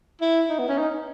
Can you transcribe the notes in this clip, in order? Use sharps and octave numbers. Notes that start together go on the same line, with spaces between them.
E4
D#4
B3
C#4
D#4